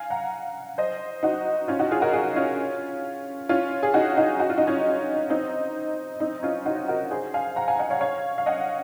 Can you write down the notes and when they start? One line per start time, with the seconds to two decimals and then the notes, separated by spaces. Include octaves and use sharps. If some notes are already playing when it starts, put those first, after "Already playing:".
Already playing: F5 G#5
0.10 F#5 A#5
0.78 C5 D#5
1.23 D#4 F#4
1.68 C#4 F4
1.79 D#4 F#4
1.91 F4 G#4
2.02 F#4 A#4
2.13 F4 G#4
2.36 C#4 F4
3.49 C#4 F4
3.83 G#4
3.94 D#4 F#4
4.17 D#4 F#4
4.40 F#4
4.50 F4
4.58 D#4
4.67 C#4 F4
5.30 C4 D#4
6.20 C4 D#4
6.43 C#4 F4
6.66 D#4 F#4
6.88 F#4 A#4
7.11 G#4 C5
7.34 F5 G#5
7.56 F#5 A#5
7.68 F5 G#5
7.79 D#5 F#5
7.90 C#5 F5
8.01 C#5 F5
8.38 F5
8.46 D#5 F#5